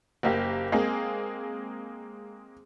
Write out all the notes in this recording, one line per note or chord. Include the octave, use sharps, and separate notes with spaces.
F#1 A#3 G4
G#3 A#3 C4 G#4